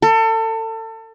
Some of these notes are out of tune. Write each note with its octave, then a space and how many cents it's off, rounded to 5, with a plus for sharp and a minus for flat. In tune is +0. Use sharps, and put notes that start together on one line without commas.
A4 +30